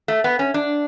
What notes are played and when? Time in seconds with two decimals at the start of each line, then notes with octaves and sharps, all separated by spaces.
0.08 A3
0.24 B3
0.39 C#4
0.54 D4